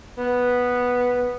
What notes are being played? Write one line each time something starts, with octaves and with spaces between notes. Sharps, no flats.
B3